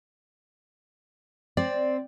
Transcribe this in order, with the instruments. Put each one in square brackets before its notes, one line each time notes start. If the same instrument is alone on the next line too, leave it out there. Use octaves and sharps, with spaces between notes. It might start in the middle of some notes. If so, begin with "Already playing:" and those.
[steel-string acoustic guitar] C4 [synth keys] D5